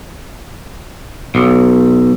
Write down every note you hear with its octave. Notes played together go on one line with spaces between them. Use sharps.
B1